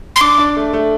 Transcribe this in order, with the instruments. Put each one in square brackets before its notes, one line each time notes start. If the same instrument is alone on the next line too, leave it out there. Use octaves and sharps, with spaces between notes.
[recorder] C6
[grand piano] D4 [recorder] D6
[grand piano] D4
A3
A3